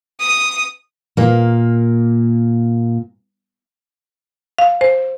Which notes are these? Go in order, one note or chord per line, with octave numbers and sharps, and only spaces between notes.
D#6
A#2 A#3
F5
C5